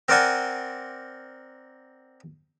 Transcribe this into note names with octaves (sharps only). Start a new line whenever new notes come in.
C4 A#4 C5 D5 F#5 G#5